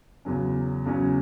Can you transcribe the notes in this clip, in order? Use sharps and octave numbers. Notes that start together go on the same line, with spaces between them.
E2 C#3 F#3 C#4
E2 C#3 F#3 C#4